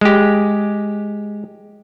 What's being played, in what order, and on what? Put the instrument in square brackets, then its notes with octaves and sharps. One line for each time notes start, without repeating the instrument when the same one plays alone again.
[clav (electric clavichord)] G#3 G4